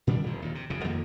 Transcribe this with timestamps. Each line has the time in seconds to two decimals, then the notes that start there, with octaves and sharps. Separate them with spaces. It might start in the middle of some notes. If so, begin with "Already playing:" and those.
0.07 A#2 D#3 G3 D4
0.23 D#1 F3
0.42 D#2 A#2
0.55 C3
0.70 F1 F2 C#3
0.84 F2 D#3 A#3